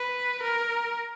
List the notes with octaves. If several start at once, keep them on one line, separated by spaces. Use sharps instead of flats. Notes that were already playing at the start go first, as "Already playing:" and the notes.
Already playing: B4
A#4